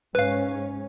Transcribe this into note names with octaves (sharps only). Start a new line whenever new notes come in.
G#2 C#4 B4 F5